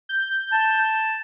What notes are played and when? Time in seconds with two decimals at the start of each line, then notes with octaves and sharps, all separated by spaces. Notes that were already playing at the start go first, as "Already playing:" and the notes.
0.09 G6
0.52 A5